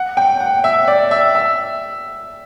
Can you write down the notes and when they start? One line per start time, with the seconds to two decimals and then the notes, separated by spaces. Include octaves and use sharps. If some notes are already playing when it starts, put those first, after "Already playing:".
Already playing: F#5
0.17 G5
0.40 F#5
0.64 E5
0.88 D5
1.11 E5
1.35 E5